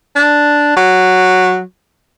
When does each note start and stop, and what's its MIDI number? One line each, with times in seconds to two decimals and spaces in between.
0.16 0.74 62
0.77 1.61 54